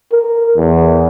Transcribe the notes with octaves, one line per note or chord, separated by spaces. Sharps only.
A#4
E2